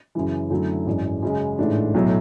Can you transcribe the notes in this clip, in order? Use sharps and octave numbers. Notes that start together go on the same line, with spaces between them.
F#2 C#3 E3
F#2 D3 F#3 A3 E4
G#1 F#2 E3 G#3
F#2 C#3 G#3
A1 G#2 E3 A3 D4
B1 A2 F#3